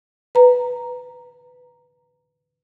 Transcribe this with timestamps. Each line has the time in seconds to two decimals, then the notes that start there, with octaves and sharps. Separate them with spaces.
0.35 B4 A#5